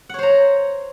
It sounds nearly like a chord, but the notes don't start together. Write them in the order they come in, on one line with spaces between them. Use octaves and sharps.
F#5 C#5 C5 A#5